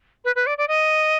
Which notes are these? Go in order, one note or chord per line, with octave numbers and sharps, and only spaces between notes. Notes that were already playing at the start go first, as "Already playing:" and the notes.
B4
B4
D5
D5
D#5